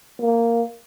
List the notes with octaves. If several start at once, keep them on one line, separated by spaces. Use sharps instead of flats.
A#3